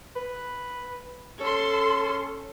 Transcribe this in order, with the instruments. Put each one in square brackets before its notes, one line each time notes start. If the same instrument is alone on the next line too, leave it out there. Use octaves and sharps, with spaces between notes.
[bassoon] B4
[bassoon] C#4 [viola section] A4 C6